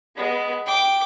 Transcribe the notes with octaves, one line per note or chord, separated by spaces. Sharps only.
G#3 B3
G5 D6